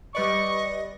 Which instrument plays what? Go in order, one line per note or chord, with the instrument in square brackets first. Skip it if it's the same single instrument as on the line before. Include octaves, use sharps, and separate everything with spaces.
[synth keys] G3 B4 D5 [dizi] D#5 [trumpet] C#6